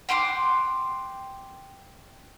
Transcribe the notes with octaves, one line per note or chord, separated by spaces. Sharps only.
F#5 G5 C6 D6